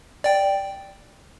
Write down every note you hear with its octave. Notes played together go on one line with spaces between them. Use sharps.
D5 G5